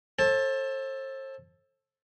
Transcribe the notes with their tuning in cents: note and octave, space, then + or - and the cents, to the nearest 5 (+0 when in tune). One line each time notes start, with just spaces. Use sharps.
A4 +0 C5 +40 A5 +0